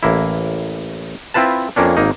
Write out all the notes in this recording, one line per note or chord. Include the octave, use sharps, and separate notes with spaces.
A1 A#3 E4
C4 E4 F4 B4 A5
F2 A#3 C#4 D4
G#1 A#3 D#4